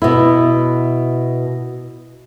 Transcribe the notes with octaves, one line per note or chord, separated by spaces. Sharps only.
B2 B3 E4